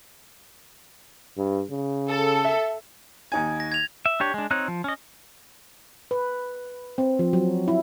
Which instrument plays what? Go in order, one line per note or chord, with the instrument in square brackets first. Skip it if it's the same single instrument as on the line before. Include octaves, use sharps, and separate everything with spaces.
[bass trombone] G2
C#3
[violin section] A4
[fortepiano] E5
[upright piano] D#2 D#4 G#5 [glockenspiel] G#6
[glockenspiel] A#6
G#6 F7
[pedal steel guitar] E5
D4 G4 C#5
G#3 D4
C4 D#4 C#5 F#6
F3
C#4 D#5
[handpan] B4
C4
F3
F#3
E4